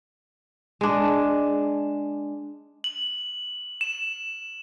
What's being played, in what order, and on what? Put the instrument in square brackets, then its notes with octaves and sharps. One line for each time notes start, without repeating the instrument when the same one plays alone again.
[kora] G#3 D4
[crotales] F#7
E7